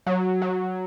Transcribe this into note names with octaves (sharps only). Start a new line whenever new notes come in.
F#3
F#3